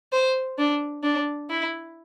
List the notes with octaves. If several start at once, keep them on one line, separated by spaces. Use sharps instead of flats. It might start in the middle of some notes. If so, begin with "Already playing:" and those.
C5
D4
D4
E4